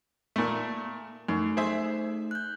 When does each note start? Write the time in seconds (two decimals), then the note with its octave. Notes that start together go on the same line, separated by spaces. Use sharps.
0.36 A#2 A3
1.28 F#2 A3 D#4
1.57 G#4 C5 E5
2.31 F#6 G6